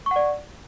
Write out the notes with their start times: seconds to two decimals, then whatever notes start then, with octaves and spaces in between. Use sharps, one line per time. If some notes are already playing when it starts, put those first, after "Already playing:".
0.06 C#6
0.11 F#5
0.16 D5